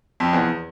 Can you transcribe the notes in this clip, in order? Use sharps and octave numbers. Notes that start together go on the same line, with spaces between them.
F2
E2